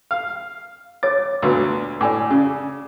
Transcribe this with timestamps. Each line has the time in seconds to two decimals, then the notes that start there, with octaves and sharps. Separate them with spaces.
0.11 F5
1.03 C#5 D6 A6
1.42 D2 A#2 B3
2.01 A2 D5 G#5 D6
2.31 C#3